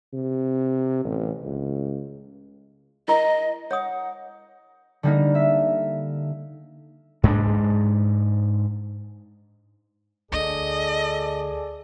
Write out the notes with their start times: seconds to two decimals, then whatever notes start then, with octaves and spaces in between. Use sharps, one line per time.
0.13 C3
1.05 A1
1.43 C#2
3.08 E4 A#4 D#5 A#5
3.71 C#5 F#5 D#6
5.03 D3 G3 A#3 D#4
5.35 E5
7.23 G#2 G#3 A#3 D4
10.32 D2 D4 G#4 A4 D5 D#5